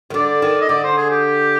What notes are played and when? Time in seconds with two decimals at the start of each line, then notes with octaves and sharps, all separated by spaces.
0.10 D#3
0.14 D3 D5
0.42 D#3
0.61 D#5
0.69 D3 D5
0.84 C5
0.97 G#4
1.11 G4